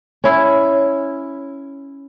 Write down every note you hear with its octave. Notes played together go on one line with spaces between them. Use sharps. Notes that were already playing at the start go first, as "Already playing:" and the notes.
C#4 E4